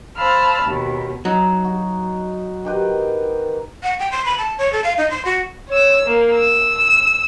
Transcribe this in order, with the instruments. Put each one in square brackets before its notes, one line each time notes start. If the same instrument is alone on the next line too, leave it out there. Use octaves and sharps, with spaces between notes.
[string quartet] C5 F5 A5 B5 E6 F6
D#2 B2
[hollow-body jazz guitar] F#3 [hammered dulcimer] D#4
[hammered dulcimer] F#4
D#3 G4 B4
[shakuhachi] F#5
G5
C6
B5
A5
C#5
A4
F5
D#4
C6
F#4
[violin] C#5 E6
A#3
E6